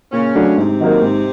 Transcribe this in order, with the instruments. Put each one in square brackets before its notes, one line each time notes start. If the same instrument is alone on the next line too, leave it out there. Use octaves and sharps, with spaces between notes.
[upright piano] A#2 [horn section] C#3 C#4
[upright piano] F#3 A3 D4
[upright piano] G#2 [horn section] C3 C4
[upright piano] D#3 F#3 A#3 D#4
G#2